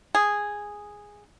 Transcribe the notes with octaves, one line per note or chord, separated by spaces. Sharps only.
G#4